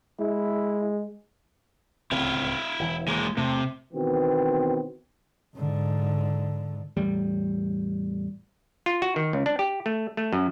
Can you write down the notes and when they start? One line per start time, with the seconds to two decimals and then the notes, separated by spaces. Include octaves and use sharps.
0.20 G#3 E4
2.12 D1 C#2 C4 E4 F5
2.79 E1 E3
3.08 G#3 A#3
3.37 E2 C3 A3
3.93 B2 D#3 E3 B3 C4
5.55 G#2 D3
6.97 E2 A2 G3
8.86 F4
9.02 F#4
9.16 D#3
9.33 C#2
9.46 D4
9.59 G4
9.86 A3
10.17 A3
10.33 F#2